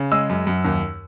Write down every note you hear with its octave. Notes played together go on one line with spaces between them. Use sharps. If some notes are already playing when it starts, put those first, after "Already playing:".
Already playing: C#3
G#3 E6
F#2
F#2
D#2